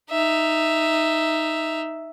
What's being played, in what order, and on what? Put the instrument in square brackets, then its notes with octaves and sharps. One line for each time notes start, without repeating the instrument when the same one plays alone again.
[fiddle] D#4 E5